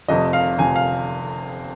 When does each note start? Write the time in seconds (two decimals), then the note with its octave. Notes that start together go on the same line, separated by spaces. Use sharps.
0.08 F1 F2 C3 D#5
0.33 F5
0.58 F1 F2 C3 G#5
0.76 F5